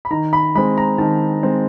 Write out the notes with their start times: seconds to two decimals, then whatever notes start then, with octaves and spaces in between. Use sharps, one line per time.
0.05 B5
0.11 D#3 A#5
0.33 B5
0.55 G#3 C4 B5
0.78 A#5
0.98 D#3 A5
1.43 G#3 C4